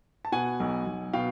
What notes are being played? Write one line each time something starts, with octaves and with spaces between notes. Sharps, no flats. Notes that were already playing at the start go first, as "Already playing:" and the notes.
A5
B2 F#5 G#5
B1
B1
B2 F5 G5